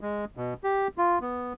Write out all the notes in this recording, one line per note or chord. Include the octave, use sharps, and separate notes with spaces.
G#3
B2
G4
F4
B3